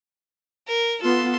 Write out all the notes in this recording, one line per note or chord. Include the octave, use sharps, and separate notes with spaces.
A#4
B3 F4 A4 C6